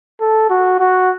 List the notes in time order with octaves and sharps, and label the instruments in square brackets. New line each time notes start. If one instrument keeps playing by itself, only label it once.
[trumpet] A4
F#4
F#4